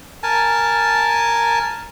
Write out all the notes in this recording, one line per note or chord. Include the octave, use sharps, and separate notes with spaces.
A#4 G#5 A5